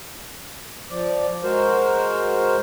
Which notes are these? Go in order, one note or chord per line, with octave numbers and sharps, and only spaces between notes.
F3 D5
G#3 F#4 A#4 C5